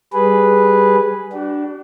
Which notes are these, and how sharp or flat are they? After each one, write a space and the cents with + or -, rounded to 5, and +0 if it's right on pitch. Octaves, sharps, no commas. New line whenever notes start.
G3 +0 G#4 +0 B4 -5
D4 +0 F#4 +45